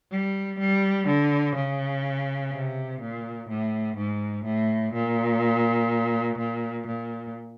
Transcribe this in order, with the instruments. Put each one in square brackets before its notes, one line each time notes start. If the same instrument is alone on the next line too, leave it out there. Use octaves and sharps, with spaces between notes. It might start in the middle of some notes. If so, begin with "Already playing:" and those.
[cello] G3
G3
D3
C#3
C3
A#2
A2
G#2
A2
A#2
A#2
A#2